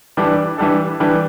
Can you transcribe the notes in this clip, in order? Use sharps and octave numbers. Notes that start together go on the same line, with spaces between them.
E3 G3 D4 A4
E3 G3 D4 A4
E3 G3 D4 A4